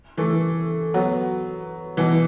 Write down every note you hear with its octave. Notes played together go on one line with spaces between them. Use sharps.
E3 A3
F#3 B3
B2 E3